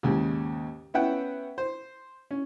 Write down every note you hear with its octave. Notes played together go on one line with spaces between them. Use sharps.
D#2 G#2 C#3
B3 C#4 E5 F#5 G5
C5
C#4